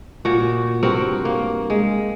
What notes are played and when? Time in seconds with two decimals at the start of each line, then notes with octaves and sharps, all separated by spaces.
0.25 A#2 F#4
0.83 G2 C4 F#4 A#4
1.25 A#3
1.70 G#3